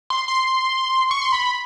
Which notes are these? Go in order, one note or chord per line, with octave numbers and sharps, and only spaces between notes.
C6
C6
C#6
C6
B5